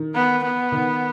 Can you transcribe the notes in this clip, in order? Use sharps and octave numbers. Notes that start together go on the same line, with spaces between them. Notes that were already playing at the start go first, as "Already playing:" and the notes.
Already playing: D#3
B3
B3
D#3